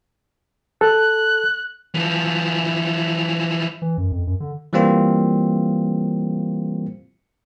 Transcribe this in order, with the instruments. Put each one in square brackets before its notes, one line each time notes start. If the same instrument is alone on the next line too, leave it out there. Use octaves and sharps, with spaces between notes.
[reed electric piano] A4 [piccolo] F#6
[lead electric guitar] E3 F3
[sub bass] E3
F#2
F2
F#2
D3
[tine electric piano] E3 G3 A#3 C4 F4